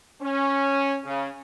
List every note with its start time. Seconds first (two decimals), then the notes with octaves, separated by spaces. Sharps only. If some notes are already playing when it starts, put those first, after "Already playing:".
0.22 C#4
1.06 C#3